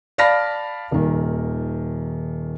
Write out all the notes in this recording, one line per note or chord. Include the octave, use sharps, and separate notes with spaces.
D5 F5 A5 B5 F6 A#6
D#1 D#3